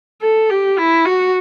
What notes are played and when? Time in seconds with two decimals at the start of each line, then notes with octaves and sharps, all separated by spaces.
0.22 A4
0.50 G4
0.78 E4
1.06 F#4